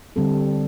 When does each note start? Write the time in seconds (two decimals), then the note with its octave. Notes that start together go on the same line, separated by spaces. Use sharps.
0.16 D3 G3 C4 A4